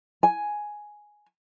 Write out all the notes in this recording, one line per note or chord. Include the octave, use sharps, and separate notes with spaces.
G#5